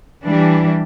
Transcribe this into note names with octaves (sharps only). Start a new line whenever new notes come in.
E3 G3 D4